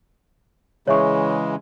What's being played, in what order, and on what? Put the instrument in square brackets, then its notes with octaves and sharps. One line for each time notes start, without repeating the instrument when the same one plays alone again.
[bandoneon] C#3 E3 G#3 [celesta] C#5 E5 C#6